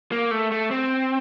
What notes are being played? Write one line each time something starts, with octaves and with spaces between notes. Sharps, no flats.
A#3
A3
A3
C4